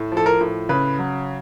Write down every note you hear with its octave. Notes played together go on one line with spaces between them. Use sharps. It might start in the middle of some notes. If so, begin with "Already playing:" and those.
Already playing: A2
F3
A4
A#4
A2
C#3 B4
F#3